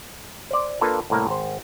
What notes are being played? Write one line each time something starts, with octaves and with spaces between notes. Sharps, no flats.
C5 D5
A#3 D4 F4 A4 B4
C2 A2 A#3 A#4
G#1 C5